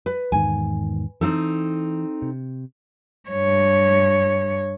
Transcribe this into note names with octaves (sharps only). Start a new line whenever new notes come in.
B4
E2 G#2 D#3 G#5
E3 C4 D#4 A4
C3
G2 C#5